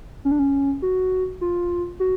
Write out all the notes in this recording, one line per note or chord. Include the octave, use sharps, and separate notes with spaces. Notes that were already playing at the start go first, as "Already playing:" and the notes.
C#4
D4
C#4
F#4
F4
F#4